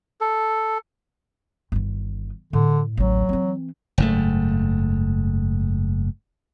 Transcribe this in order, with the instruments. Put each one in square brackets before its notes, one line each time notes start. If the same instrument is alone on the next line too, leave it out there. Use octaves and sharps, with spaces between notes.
[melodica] A4
[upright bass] G1 D#3
[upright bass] A2 [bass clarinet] D3
[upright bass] A1 D2 [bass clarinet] F#3
[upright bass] E3 C4
[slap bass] F#1 G#2 A3